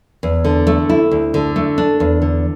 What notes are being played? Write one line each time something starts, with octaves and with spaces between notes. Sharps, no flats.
E2
D3
A3
E4
D2
D3
A3
D4
E2
D3